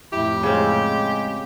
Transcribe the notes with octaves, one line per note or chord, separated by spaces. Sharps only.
F2 A2 E4 G4
C#3 G#3 C4